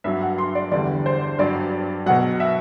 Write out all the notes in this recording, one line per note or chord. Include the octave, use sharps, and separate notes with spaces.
G2 F#3 E5
F#5
C6
D5
E2 D3 G3 D5
C5
G2 F#3 D5
B2 F#3 F#5
E5